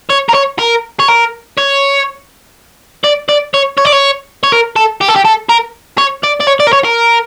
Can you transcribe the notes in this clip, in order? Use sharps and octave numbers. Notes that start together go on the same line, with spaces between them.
C#5
A#4
C#5
A#4
C#5
A#4
C#5
D5
D5
C#5
C#5
D5
C#5
C#5
A#4
A4
G4
A4
G4
A4
A#4
C#5
D5
D5
C#5
D5
A#4
C#5
A#4